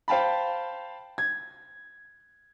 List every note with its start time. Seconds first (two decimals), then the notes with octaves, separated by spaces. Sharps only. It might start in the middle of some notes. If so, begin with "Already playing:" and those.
0.08 C5 F5 G5 A5 B5
1.18 G#6